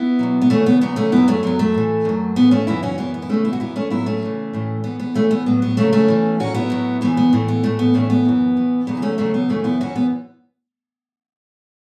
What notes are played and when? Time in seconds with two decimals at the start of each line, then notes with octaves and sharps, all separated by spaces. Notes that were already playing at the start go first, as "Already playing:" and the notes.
Already playing: B3 E4
0.19 E2 B2 F#3
0.42 B3
0.50 F#2 C#3 E3 A3 C#4
0.66 B3
0.81 E2 C#3 F#3 B3
0.96 A3 C#4
1.12 F#2 F#3 B3 E4
1.28 A3 C#4
1.43 F#2 F#3 B3
1.59 A3
1.74 A2 E3
2.05 F#2 F#3
2.36 A2 E3 B3
2.51 A3 C#4
2.67 F#2 C#3 E3 B3 E4
2.83 C#4 F#4
2.98 F#2 E3 B3 E4
3.14 B3
3.22 E4
3.29 E2 C#3 E3 A3 C#4
3.45 B3 E4
3.53 F#4
3.60 F#2 E3 B3 E4
3.76 A3 C#4
3.90 A2 F#3 B3 E4
4.06 A3 C#4
4.23 E2 C#3 E3
4.53 A2 E3
4.84 A2 E3 B3
5.00 B3
5.14 E2 E3 A3 C#4
5.31 B3
5.46 A2 F#3 B3
5.62 B3
5.77 F#2 C#3 F#3 A3 C#4
5.93 A3 C#4
6.08 E2 E3
6.40 A2 F#3 C#4 F#4
6.54 B3 E4
6.70 A2 F#3
7.01 F#2 C#3 E3 B3
7.17 B3
7.33 A2 E3 A3
7.48 B3
7.63 A2 E3 A3
7.79 B3
7.94 A2 E3 A3 C#4
8.10 B3
8.25 F#2 E3
8.57 A2 E3
8.87 E2 C#3 F#3 B3
8.97 E4
9.02 A3 C#4
9.18 E2 C#3 F#3 A3 C#4
9.34 B3
9.49 F#2 C#3 E3 A3 C#4
9.64 B3 E4
9.80 F#2 E3 C#4 F#4
9.96 B3